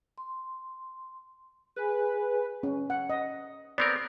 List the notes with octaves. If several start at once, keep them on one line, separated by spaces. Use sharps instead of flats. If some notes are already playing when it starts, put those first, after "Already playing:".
C6
G#4 B4 G#5
C#4
F#5
D#5
B3 C4 A#4 D5